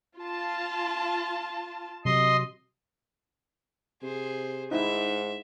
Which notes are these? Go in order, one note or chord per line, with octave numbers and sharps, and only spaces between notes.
F4 A5
C3 F#3 D#5 C6
C3 G#4 C5
G#2 D#4 E4 E5